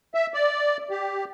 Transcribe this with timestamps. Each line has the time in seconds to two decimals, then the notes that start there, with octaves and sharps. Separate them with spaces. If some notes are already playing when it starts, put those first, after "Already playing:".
0.14 E5
0.34 D5
0.91 G4